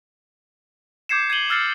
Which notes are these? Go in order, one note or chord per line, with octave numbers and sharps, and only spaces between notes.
D6 G6 G#6 C7 C#7 E7
G#6 C7 D#7 F#7 G7
E6 F6 A6 C7 C#7 E7